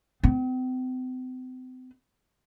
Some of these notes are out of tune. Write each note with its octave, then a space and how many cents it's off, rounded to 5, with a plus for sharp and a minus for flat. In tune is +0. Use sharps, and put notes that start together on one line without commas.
C4 -40